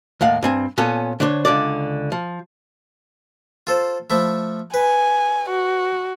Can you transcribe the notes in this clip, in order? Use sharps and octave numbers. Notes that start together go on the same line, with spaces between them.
D#2 A2 F5 F#5
G2 C4 G#5
A#2 B3 C#4 A4
D3 D4 C5 C#5
C#2 A#2 D3 D5
F3
F4 A4 C5
F3 A3 E4
B4 G#5
F#4